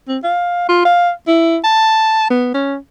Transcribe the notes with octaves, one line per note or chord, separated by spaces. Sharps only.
C4
F5
F4
F5
E4
A5
B3
C#4